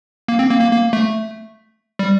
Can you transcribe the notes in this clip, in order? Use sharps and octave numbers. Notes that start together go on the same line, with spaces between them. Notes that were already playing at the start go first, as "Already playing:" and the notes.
A#3
C4
A#3
A#3
A#3
A3
G3